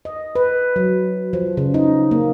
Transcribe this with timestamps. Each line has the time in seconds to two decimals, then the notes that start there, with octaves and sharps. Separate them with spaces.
0.05 D#5
0.35 B4
0.76 F#3
1.33 F3
1.57 C#3
1.74 D#4
2.11 A#3